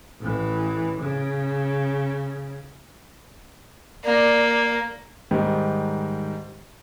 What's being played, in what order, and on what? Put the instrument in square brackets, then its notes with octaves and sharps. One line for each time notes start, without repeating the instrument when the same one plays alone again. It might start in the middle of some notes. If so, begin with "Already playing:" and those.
[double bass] A1 E3
C#3
[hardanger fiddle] A#3 [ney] D5
[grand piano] G#2 D#3 G3